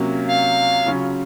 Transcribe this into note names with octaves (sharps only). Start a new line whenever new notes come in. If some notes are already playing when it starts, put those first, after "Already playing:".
Already playing: C3 F#3 A#3 C#4 F4
F5
C#3 F#3 C#4 F4